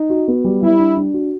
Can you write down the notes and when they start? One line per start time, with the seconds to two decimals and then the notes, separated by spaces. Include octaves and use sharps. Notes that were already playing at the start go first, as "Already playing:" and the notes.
Already playing: D#4
0.10 F#4
0.28 B3
0.44 G3
0.62 G3 E4
0.79 D4
0.97 D4
1.14 F#4